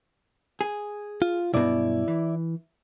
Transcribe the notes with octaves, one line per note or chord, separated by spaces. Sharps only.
G#4
F4
B1 G2 B2 E4 D5
E3